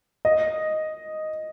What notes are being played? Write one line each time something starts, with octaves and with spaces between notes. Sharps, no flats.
D#5